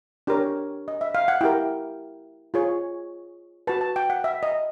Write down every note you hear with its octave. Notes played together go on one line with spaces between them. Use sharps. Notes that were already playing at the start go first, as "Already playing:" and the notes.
D4 G4 A#4 C#5
D#5
E5
F5
F#5
E4 G4 A#4 G5
F4 G#4 C#5
F#4 B4 A5
A5
G5
F#5
E5
D#5